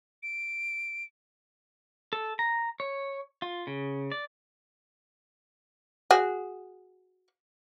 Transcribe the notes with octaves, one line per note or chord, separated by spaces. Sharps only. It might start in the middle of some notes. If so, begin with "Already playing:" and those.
D7
A4
A#5
C#5
F4
C#3
D5
F#4 G#4